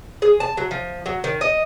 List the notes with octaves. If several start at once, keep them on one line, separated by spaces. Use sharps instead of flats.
G#4
A5
F#3
F3
F#3
D#3
D#5